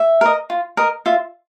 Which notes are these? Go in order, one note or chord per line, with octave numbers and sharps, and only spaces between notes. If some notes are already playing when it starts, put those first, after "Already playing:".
Already playing: E5
A#4 D#5
F4
A#4 D#5
F4 E5